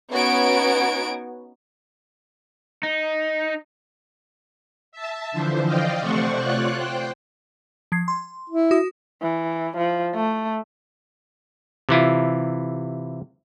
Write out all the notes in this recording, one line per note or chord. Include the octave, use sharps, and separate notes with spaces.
B3 C#4 D#4 F#4 G#6 D7
D#4
E5 A5
D3 E3 F3 C5
D5 D#5 F5 G5
C3 A3 C5 D5 F#5 C#6
F4 C#5 D5 F#6
C5 G5
F3 G#6 C7
C6
E4
F#4 D#6
E3
F3
A3
C3 E3 E4 F4